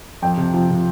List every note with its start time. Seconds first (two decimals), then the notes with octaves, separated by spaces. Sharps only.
0.22 F2 G5
0.37 C3
0.54 F3
0.70 C3